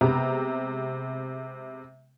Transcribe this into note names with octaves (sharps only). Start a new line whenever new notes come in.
C3 G#3 B3 A#5